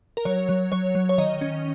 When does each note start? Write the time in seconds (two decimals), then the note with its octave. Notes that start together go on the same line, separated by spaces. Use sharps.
0.17 A#4
0.25 F#3 C#5
0.49 F#3
0.72 F#3 C#5
0.95 F#3
1.09 C#5
1.18 D#3 D#5
1.41 C#4